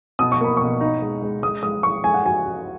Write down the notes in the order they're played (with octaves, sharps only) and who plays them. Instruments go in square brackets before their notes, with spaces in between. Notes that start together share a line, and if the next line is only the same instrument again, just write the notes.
[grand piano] B2 [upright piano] D#6
[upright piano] C#6
[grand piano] A#3 [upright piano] B5
[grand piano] B2 [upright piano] C#6
[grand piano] D#4
G#3
G#3
[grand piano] G#3 [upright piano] D#6
[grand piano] G#3 [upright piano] D#6
[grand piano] G#3 [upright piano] C#6
[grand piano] G#3 [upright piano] G#5
[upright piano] F#5
[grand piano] F#4 [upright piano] G#5
[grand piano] F#4